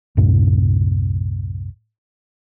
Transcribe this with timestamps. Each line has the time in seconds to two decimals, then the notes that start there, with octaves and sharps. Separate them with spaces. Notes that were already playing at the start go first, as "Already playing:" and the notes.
0.17 C2 F#2 A2 C3